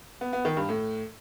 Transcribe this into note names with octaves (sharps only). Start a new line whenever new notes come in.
B3
B3
D#3
G2
A2